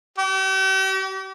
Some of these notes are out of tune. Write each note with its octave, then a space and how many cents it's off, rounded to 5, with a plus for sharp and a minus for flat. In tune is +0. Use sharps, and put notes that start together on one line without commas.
G4 -40